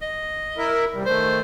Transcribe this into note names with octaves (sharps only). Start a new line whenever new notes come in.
D#5
E4 A#4 E5
C3 G3
D#3 A3 C5